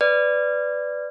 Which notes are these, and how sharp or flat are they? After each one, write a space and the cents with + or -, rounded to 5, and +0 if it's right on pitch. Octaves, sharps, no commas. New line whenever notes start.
B4 +15 D5 +0